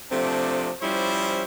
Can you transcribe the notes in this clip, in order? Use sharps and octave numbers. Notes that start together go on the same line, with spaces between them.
C3 F3 A3 C4 D4
F3 G3 C#4 E4 C5